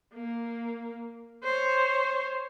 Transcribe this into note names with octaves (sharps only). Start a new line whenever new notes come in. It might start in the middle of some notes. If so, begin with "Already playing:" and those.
A#3
C5 C#5